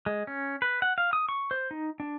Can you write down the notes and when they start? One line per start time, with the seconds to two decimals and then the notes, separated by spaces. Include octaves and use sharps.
0.06 G#3
0.27 C#4
0.62 B4
0.82 F#5
0.98 F5
1.13 D#6
1.29 C#6
1.51 C5
1.71 D#4
2.00 D4